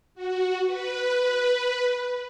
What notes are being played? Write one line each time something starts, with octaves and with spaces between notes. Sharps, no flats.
F#4
B4